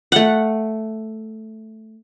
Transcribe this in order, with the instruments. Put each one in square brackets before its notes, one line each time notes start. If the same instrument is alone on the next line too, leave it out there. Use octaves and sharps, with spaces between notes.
[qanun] A3 F#5